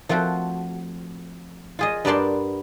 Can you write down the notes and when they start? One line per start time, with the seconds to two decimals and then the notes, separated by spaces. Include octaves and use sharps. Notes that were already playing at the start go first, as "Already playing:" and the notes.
0.09 F3 A3 C4 F#4
1.79 F4 G#4 D#5
2.05 G2 B3 A#4 D5 A5 C6